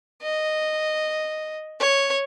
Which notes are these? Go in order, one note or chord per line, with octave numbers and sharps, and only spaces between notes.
D#5
C#5